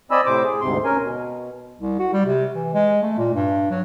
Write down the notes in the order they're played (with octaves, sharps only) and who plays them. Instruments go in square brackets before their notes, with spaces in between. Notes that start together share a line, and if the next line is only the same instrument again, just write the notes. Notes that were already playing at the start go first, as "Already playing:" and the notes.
[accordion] C4 D5 D#5 G#5 B5 E6
A2 C3 C5 D6
G#4
D2 G#2 C3 C6
C#4 A#4 G#5
B2
[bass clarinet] C2
F#4
G3
C3
E3
G#3
A3
A#2
G2
F#3